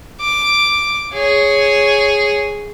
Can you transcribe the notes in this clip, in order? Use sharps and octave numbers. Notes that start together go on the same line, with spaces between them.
D6
G#4 C#5